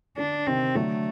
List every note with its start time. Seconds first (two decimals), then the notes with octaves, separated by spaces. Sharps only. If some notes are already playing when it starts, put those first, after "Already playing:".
0.17 D3 D4
0.47 C3 D#3 C4
0.75 D3 F#3 A3